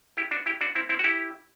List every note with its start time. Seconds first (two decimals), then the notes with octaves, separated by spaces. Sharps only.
0.17 E4 G4
0.31 D4 F#4
0.46 E4 G4
0.61 D4 F#4
0.75 C4 E4
0.89 C4 E4
0.99 F#4
1.04 E4 G4